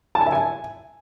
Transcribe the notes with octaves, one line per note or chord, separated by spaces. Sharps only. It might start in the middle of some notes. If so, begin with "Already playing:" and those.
A5
G#5
E5
G#5